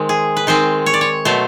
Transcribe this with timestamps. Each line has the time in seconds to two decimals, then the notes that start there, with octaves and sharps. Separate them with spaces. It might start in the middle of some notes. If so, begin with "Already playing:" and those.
Already playing: D#3 G#3 C4
0.09 G#4
0.37 B4
0.47 D#3 G#3 C4 C5
0.86 C#5
0.94 D5
1.01 C#5
1.25 B2 F#3 A3 C5